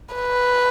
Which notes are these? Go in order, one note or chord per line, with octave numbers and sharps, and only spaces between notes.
B4